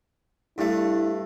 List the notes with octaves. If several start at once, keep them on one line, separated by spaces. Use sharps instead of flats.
G2 A3 E4